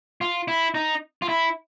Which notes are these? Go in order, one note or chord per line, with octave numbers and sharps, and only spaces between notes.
F4
E4
D#4
F4
E4